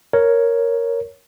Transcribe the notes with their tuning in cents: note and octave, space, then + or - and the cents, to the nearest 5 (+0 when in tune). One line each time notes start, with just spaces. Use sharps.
A#4 +0 C#5 +0